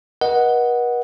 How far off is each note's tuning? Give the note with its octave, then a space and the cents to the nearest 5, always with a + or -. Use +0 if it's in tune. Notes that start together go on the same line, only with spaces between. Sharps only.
B4 -45 D#5 +0 F#5 +0